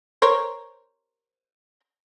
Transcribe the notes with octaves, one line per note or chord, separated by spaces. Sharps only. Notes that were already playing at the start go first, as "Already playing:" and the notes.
A#4 C5 C#5